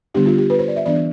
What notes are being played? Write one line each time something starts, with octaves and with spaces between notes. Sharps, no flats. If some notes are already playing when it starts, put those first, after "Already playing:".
D3 G3 B3 D4 G4
F4
G4
B4
C5
D5
E5
E3 B3 D4 D5